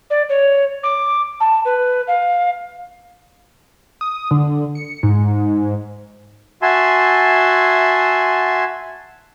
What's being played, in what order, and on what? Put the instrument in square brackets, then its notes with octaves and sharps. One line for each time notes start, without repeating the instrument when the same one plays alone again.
[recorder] D5
C#5
D6
A5
B4
F5
[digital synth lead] D#6
D3
C#7
G#2
[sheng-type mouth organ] F#4 E5 G#5 A5 C6